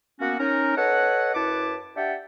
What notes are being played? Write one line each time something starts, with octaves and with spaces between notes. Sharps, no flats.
A#3 B3 C#4 F#4
C#4 D#4 A#4
A4 B4 C#5 D#5 F#5
F#2 E4 B4 A5 D6
D4 G4 E5 F#5 G5 A5